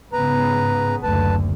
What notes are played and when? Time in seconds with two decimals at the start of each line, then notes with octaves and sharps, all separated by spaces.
0.13 G#2 C#3 B3 B4 A#5
1.03 F#1 D2 B4 A5